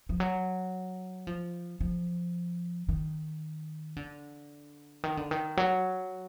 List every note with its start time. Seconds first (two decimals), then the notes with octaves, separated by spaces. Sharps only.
0.09 F3
0.20 F#3
1.27 F3
1.81 F3
2.88 D#3
3.96 D3
5.04 D#3
5.17 D3
5.31 D#3
5.57 F#3